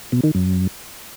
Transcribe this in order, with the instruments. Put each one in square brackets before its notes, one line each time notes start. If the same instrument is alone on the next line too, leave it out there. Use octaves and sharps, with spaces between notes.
[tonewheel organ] B2
D#3
F#2